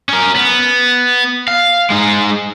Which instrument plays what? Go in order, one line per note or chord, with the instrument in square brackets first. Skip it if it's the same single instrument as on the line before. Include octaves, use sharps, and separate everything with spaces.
[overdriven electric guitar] C#4 A#4
B3
F5
G#3 D#4